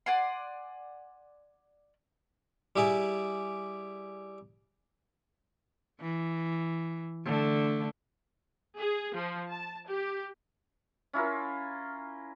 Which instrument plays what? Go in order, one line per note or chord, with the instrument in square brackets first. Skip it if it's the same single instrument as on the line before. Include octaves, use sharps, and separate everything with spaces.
[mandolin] D5 F#5 G#5 C6
[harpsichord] G3 E4 G#4 D5
[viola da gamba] E3
D3 A3
[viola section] G#4
F3
A5
G4
[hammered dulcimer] C#4 E4 F4 A#4